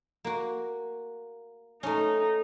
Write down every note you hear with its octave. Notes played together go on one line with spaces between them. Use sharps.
A#3 F#4
A3 C#4 D#4